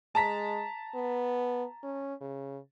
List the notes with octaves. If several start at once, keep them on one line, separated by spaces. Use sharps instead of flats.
G#3 A5 A#5 B6
B3
C#4
C#3